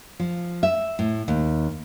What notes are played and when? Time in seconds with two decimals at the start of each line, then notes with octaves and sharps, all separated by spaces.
0.20 F3
0.63 E5
0.99 A2
1.28 D#2